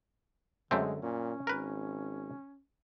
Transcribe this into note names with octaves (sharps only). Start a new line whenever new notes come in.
F#2 D3 G#3 A3 C4
A#2 C#4
G#1 A#4 B4